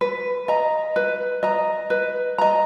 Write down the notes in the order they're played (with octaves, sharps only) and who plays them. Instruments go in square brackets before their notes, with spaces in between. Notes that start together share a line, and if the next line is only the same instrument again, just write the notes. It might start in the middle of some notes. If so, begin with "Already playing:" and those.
[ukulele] B4
D#5 A#5
B4
D#5 A#5
B4
D#5 A#5